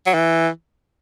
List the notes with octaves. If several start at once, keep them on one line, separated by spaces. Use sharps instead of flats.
F#3
E3